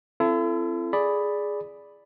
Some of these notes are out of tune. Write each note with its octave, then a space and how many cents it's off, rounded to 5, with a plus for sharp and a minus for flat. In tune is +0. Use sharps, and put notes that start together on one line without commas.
C4 +0 E4 +45 A4 +0
G#4 +0 D5 +0 B5 +0